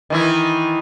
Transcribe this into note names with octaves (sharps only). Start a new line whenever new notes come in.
D#3 E3 E4